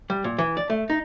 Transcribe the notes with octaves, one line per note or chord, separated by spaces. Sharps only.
G3
A#2
E3
D5
A3
D#4